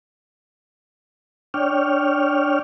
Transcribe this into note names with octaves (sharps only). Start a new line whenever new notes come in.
D4 C#5 D5 G5 F6